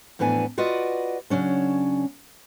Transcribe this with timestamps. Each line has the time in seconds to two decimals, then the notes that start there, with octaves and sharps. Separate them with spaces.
0.19 F2 A2 E3 B3 D4 G#5
0.58 F4 F#4 B4 D5 D#5
1.30 C#3 F#3 C#4 D4